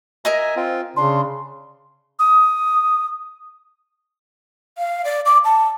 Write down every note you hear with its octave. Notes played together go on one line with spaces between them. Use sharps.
A#4 D#5 E5 G#5 A#5
C4 F4
C#3 D4 C6
D#6
F5
D5
D6
A5